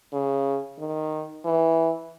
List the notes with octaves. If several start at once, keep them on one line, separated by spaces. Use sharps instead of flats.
C#3
D#3
E3